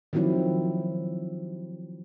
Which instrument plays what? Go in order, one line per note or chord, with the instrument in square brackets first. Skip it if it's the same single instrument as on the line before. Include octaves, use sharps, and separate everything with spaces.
[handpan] D#3 F3 F#3 C4 E4